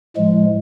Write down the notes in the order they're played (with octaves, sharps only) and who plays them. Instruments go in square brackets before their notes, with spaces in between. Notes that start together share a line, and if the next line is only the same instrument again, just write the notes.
[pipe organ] A2 F3 G#3